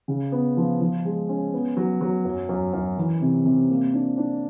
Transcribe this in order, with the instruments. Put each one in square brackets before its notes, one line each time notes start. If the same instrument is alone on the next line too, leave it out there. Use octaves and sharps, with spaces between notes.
[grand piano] C#3
B3
F3
F3
G#3
C#4
B3
F#3
F#3
F#2
F#2
F#2
E3
C3
C3
A#3
D4
D4